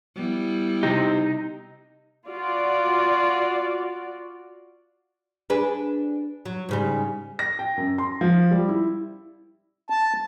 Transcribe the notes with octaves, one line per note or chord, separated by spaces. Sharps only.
G3 B3 E4
C3 D#4 G4
F4 F#4 D5
D4 G#4 B4
F#3
G#2 C#3 G3
A#6
G5
F#2
C6
F3
G3
E4
A5